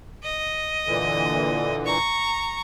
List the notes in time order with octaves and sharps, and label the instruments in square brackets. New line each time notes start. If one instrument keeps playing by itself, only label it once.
[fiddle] D#5
[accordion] A#2 D3 E3
[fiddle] A#5 C#6